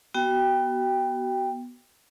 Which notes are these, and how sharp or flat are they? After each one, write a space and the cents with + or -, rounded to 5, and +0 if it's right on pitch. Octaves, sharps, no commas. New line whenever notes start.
B3 -10 F#4 +30 G5 +10